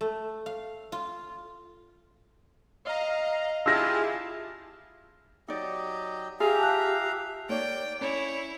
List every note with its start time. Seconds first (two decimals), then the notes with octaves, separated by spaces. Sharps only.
0.01 A3
0.46 F5
0.92 F4
2.86 D#5 F5 A#5
3.66 E4 F4 G4 G#4 A5 E6 A#6
5.48 F#3 D#4 G4 D5 D#5
6.40 F4 G4 G#4 E5 F5 G#5 A#5
6.59 A5 F#6
7.49 A#3 D#4 C#5 D5 G5
8.01 C#4 E4 C#5